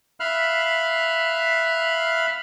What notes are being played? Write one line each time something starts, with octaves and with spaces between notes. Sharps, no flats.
E5 F5 B5 F6 F#6